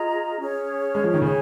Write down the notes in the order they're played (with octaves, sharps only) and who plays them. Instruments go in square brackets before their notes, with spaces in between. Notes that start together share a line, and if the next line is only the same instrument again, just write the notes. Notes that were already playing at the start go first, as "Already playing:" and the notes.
Already playing: [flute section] F4 G#4 D#5 A#5
C#4 G#4 C#5
[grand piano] G#3
F3
D#3
[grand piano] C#3 [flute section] G#4 C#5 G#5